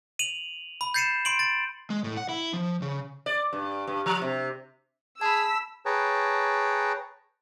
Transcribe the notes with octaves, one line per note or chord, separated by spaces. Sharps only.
D#7 F7 F#7
B5
G6 A6 C7 C#7 D#7 E7
C6 D7 F#7
A6 D7
G#3
A2
F#5
E4
F3
C#3
D5
G2
G2
F3
C3
G#4 A5 B5 E6 B6
G#4 B4 C#5 G5 A5 A#5